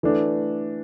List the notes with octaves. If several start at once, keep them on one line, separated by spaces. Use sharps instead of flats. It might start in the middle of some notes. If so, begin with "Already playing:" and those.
E3 A3 D4